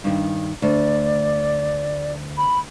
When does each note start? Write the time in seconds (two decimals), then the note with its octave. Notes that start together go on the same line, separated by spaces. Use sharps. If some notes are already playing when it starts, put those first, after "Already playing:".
0.04 G2 D#3
0.62 D2 D5
2.38 B5